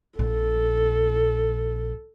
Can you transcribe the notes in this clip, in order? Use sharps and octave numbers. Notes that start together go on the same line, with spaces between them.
A#1 A#2 A4